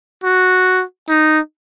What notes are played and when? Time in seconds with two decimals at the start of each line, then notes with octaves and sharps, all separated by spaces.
0.24 F#4
1.09 D#4